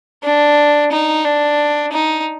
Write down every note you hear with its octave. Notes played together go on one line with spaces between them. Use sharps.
D4
D#4
D4
D#4